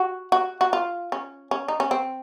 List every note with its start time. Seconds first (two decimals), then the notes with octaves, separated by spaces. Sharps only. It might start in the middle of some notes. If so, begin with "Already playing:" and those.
Already playing: F#4
0.32 F#4
0.61 F#4
0.73 F4
1.12 C#4
1.51 C#4
1.68 D#4
1.80 C#4
1.91 C4